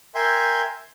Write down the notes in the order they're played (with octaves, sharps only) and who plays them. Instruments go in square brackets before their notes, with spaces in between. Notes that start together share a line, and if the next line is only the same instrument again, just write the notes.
[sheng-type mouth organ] A#4 E5 G5 G#5 C6 G6